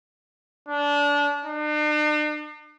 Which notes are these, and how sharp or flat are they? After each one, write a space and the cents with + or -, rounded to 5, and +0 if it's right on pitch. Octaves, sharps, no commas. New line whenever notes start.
D4 -25
D4 +45